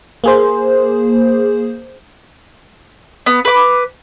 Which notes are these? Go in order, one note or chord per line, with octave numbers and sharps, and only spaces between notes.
A#3 G#4 C5
B3
B4 D6